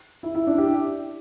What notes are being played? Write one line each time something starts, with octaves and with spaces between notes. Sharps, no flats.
E4
E4
D4
G4